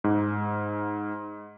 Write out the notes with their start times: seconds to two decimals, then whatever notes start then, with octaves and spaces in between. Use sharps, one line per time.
0.04 G#2